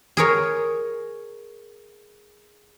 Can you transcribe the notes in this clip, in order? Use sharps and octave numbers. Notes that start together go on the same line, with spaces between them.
G#4 A#4 C#5